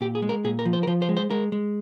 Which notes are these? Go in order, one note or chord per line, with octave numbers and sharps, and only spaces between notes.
A#2 G4
G#4
G#3
A#4
A#2 G#4
A#4
F3
C5
A#4
F3 C5
C5
G#3
C5
G#3 A#4
G#3